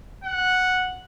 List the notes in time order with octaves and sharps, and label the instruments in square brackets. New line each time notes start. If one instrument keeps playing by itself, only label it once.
[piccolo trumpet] F#5